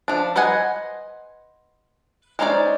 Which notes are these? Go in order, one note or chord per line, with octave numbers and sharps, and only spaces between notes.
F3 D4
B4 C5 D#5 F#5 G#5
G#3 C#4 D#4 C5 D5